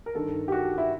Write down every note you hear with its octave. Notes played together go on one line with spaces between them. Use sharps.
A#4
G2 D#3 A4
G4
F#4
E4